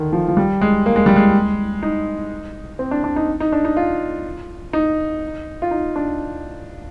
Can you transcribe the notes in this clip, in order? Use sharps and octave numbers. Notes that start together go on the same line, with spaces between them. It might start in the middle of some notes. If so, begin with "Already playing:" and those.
Already playing: D3 D#3
F3
F3
G3
G#3
A#3
G#3
G3
G#3
D#4
C4
D4
D4
D#4
D#4
D4
D#4
F4
D#4
F4
D#4
D4